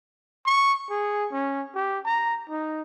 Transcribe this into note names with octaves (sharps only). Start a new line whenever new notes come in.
C#6
G#4
C#4
G4
A#5
D#4